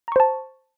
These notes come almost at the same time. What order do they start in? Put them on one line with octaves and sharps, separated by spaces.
A#5 C#6 C5 A5